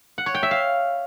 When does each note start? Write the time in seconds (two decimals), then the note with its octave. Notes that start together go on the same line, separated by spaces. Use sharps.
0.18 F#5
0.26 C#5
0.34 G5
0.43 E5
0.51 F5